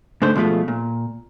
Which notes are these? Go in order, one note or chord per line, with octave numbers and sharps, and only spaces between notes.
G#2 D3 A3 C5
B2 F3 G#3 A3 F4
A#2